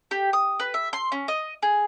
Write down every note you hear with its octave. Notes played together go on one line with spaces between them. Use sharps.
G4
D#6
B4
E5
C6
C#4
D#5
G#4